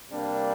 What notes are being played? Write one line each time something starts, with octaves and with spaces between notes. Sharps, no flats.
C3 G3 A#3 D4